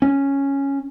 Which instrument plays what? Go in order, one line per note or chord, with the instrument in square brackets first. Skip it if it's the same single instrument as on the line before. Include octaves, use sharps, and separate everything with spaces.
[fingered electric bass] C#4